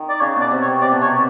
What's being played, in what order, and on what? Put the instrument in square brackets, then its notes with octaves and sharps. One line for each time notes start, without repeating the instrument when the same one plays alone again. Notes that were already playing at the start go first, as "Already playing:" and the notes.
Already playing: [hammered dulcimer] D#3
[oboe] D5
[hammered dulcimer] C#3 [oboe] C#5
[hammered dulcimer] B2 [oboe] D5
[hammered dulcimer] C3
[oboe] C#5
[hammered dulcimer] C3
[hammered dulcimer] C3 [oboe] D5
[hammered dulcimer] B2
[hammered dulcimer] C3 [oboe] C#5